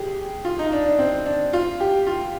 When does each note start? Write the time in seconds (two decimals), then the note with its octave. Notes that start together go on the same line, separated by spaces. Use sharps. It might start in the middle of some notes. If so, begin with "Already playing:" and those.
Already playing: G4 G#4
0.45 F4
0.59 D#4
0.72 D4
0.86 D4
0.99 C4
1.26 D4
1.53 F4
1.80 G4
2.07 F4